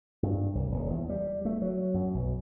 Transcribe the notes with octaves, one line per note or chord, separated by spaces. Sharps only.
G2
C2
D#1
E2
G3
A3
F#3
F#2
B1